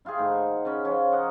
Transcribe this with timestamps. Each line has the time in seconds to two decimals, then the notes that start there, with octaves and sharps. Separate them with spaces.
0.05 E4 F4 G4 G#4
0.17 A2 D#3 C5 G#5
0.30 F#5 G#5
0.65 C#3 C#4 B5
0.85 F3 C#4 F4
1.12 A#4 C#5 D#5 F#5